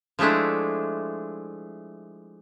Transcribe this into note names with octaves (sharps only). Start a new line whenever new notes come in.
F3 G#3 A3 D4 E4